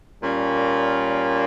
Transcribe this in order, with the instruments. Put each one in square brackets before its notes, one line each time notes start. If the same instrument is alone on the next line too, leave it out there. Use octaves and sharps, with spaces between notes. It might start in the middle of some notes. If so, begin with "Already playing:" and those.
[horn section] A#2 G3 A#3 C#4